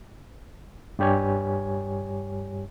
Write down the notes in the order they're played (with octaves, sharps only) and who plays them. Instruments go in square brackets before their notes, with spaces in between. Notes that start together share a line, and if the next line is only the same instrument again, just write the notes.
[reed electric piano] G2 G3 G4 C#5 G#5